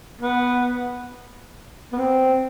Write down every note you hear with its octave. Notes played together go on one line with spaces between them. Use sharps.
B3
B3
C4